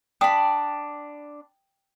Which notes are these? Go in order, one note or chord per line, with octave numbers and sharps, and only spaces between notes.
D4 G5 B5 D#6